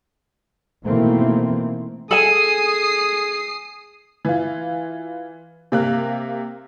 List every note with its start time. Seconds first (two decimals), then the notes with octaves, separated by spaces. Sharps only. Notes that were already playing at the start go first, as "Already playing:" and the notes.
0.84 B2 D#3 E3 A3 A#3 C4
2.11 G#4 A4 G#5 D#6 C7 D#7 E7 F#7
4.25 E3 F4
5.72 C3 A#3 F#6